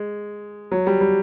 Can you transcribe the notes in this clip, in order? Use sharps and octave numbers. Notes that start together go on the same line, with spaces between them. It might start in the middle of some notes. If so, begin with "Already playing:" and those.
Already playing: G#3
F#3
G3
G3